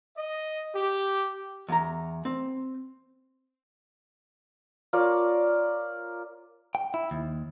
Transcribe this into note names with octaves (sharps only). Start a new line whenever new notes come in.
D#5
G4
E2 A#5
C4
F4 A#4 C#5 D5
G5
E4
D#2